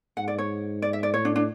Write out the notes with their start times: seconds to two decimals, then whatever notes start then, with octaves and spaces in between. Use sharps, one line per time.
0.17 G#2 F#5
0.28 D5
0.38 C#5
0.82 D5
0.93 E5
1.03 D5
1.14 A2 C#5
1.25 D4
1.36 D4